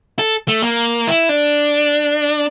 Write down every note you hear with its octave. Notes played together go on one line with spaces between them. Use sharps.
A4
A3
A#3
E4
D4